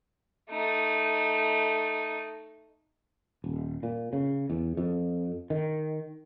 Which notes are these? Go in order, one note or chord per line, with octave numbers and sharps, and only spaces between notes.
A3 D#4
D#1
A#2
C#3
E2
F2
D#3